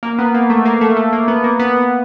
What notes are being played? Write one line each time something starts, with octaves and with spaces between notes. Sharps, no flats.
A#3
B3
A#3
A3
A#3
A3
A3
A#3
B3
A#3
B3